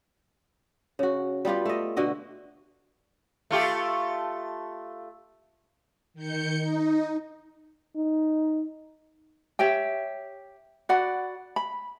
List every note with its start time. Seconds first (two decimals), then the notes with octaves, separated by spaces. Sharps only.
0.99 C#3 F#4
1.45 G3 B3 F4 G4
1.65 A3 D#5
1.97 B2 D3 F#4 D#5
3.51 A3 F4 G4
6.14 D#3 G6 C#7
6.57 D#4
7.96 D#4
9.59 G4 C#5 E5 G5
10.89 F#4 D5 F#5 B5
11.56 B5